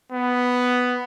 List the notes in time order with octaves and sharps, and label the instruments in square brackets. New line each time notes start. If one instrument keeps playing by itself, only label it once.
[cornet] B3